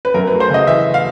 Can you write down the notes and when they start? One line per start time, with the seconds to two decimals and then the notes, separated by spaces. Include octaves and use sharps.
0.05 B4
0.14 F#2 A#4
0.27 A3 B4
0.40 C5
0.50 C#3 D#5
0.67 E3 E5
0.94 F5